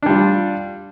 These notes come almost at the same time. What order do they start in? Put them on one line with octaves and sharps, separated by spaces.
D4 G3 F4